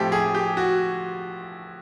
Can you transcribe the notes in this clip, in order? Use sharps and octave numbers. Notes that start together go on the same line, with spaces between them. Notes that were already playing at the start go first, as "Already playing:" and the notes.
Already playing: A2 F3 A3 C4 G4
G#4
G4
F#4